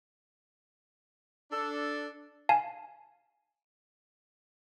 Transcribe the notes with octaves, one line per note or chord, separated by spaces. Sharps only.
D4 A4
F5 G#5 A5